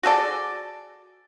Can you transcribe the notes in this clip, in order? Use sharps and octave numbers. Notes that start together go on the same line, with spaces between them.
F#4 G#4 A4 D5